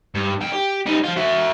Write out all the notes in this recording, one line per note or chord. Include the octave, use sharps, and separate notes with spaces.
G2
F2 G5
G4
G3 D#4
F3 F4
F#4 E5